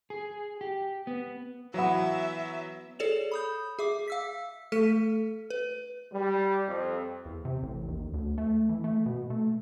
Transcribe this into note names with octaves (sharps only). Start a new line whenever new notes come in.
G#4
G4
B3
E3 F#3 B3 E5 F#5
G#4 A4 C#5 D5 E7 F7
B5 D#6 G6
G#4 E5 D6
F5 E6 B6
A3 A4 F6 B6 D#7
B4
G3
F2
E2
C3
A1
D#2
D2
A3
E3
A3
B2
A3